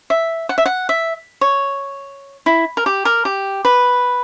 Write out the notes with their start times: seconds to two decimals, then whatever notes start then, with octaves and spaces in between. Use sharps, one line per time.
0.10 E5
0.49 F#5
0.58 E5
0.66 F#5
0.89 E5
1.41 C#5
2.46 E4
2.77 A#4
2.86 G4
3.05 A#4
3.25 G4
3.65 B4